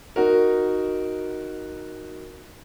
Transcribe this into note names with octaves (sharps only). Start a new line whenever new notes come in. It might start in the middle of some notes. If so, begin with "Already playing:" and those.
D#4 F#4 A#4